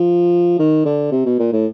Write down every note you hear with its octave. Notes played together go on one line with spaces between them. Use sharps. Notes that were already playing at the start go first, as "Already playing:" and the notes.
Already playing: F3
D#3
D3
C3
B2
A#2
A2